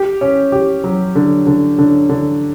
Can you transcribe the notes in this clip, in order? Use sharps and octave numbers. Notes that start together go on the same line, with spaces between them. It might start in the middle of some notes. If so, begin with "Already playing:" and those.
Already playing: G4
C#4
G4
F#3
D3
D3
D3
D3